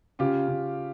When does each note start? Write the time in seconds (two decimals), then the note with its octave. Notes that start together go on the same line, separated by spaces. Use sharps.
0.19 C#3 F4 G4
0.48 C#3